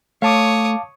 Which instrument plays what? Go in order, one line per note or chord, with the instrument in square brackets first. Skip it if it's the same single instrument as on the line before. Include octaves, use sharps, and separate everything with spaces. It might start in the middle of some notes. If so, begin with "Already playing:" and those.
[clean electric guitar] A3 [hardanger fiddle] C#5 D#6 [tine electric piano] F5 A5 D6